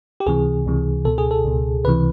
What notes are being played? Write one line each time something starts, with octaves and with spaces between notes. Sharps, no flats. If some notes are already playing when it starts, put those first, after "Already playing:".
G4
C#2 C3 E3 G#4
C#2 C3 E3
C#2 B2 A4
G#4
A4
C#2 B2
C#2 C3 E3 B4